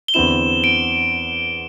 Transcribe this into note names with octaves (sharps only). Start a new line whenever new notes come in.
G7
E2 D3 C4 E4 E7
D7